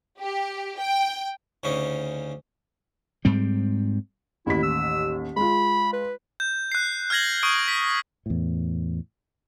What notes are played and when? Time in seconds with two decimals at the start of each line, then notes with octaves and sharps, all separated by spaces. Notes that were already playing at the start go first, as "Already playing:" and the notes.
0.20 G4
0.78 G5
1.64 D2 C#3 C#4 D#4
3.25 G#2 G3 C4
4.46 A1 D#2 E4 B6
4.63 E6
5.36 G#3 F4 B5
5.93 B4
6.40 G6
6.72 F#6 C7
7.10 F6 F#6 G#6 A#6 F#7
7.43 C#6 D#6 D7
7.68 B6
8.26 E2 A2